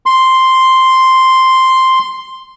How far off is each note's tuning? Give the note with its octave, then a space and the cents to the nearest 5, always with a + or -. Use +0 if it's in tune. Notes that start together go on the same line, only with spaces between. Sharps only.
C6 +0